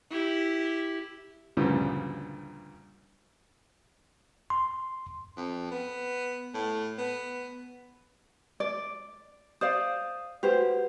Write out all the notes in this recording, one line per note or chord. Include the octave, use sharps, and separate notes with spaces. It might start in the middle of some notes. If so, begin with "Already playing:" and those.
E4 G4
D2 G2 A#2 C#3 F3 G3
C6
F2
B3
A2
B3
D5
C5 D5 F5 D#6
F#4 G4 B4 C5